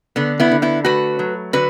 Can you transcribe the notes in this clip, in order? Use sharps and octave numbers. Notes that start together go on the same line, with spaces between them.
D3 B3
B3 E4
D3
B3 E4
A3 F#4 B4
F#3
D3 F#4 B4